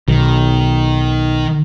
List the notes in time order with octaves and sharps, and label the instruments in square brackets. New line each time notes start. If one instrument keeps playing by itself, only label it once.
[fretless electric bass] B1 [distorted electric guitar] D#3